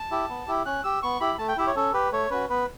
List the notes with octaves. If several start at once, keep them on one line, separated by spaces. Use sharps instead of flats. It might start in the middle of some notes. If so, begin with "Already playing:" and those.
Already playing: A5
E4 G4
B3
E4 G4
C#4 F#6
G4 E6
B3 C#6
E4 G4 B5
A3 A5
G5
E4 G4 E5
C#5
C#4 A4
G4 B4
A3 C#5
C#4 F#4 B4
B3 B4